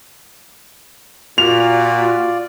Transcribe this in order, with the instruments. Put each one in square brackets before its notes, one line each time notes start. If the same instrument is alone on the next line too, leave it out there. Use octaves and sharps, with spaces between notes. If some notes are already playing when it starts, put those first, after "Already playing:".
[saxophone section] A#2 [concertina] F4 D5 [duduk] F#4 [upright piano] F7